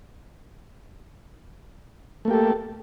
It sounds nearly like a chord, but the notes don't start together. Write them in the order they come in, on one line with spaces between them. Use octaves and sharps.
A3 A#3 G4 A4